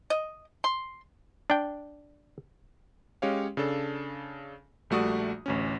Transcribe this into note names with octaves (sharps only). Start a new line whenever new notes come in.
D#5
C6
D4 G5
G#3 C#4 G4 C#5 F5
C#3 D4 A4
A#1 G3 A3 F#4 D5 D#6
A1 D2 C#4